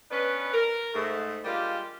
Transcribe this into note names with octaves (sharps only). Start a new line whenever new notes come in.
B3 C#4 D4 B4
A#4
G#2 A3
G3 G#3 A#3 D4 F4 G4